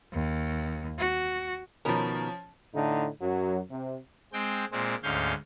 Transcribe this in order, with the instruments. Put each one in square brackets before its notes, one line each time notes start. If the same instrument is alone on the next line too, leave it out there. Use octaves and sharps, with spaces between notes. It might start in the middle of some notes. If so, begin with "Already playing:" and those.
[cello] D#2
F#4
[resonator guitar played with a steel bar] B2 D#3 A#4 [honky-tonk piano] F3 C#4
[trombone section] A2 D3 A3 D#4
F#2 F#3
C3
[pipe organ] G#3 C4 G5
A#2 G#3 C4
D2 G#2 C#4 F5 G6